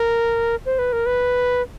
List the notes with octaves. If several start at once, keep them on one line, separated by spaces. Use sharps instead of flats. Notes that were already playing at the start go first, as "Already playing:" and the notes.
Already playing: A#4
C5
B4
A#4
B4